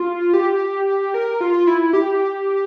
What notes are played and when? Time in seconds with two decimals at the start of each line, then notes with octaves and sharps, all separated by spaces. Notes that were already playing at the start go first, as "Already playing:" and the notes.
Already playing: F4
0.33 G4
1.14 A#4
1.41 F4
1.67 E4
1.93 G4